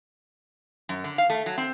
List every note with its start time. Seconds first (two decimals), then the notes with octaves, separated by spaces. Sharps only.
0.89 F#2
1.04 D3
1.18 F5
1.30 A3
1.46 F#3
1.58 C4